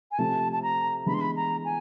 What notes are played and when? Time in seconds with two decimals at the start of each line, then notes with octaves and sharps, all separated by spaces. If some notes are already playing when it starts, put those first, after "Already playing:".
0.11 G#5
0.18 C3 F3 A3 A5
0.52 A5
0.62 A#5
1.06 E3 G#3 B3 D4 B5
1.14 C6
1.21 B5
1.36 A#5
1.64 G#5